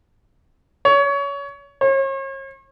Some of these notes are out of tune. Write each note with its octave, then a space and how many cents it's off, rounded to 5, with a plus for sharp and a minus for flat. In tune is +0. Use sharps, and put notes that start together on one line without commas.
C#5 +25
C#5 -40